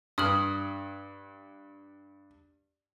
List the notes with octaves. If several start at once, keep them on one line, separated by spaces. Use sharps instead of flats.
G2 D#6 F6 F#7